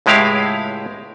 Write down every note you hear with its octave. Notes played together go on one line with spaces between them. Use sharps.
C#2 A2 G#3 E4 G4 F5